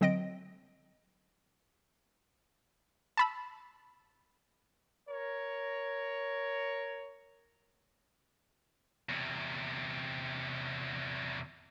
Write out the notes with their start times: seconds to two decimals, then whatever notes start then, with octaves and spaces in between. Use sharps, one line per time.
0.01 D3 F#3 C4 D#5 A#6 D7
3.17 A5 B5 E6
5.09 A#4 C#5
9.09 E2 C3